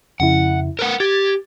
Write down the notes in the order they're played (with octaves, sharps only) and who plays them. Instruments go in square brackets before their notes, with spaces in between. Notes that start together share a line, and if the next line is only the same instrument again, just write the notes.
[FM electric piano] F2 C#3 E4 [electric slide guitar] F#5
[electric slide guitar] A#4 B4 F#5
[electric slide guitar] G4 [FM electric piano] G#6 A6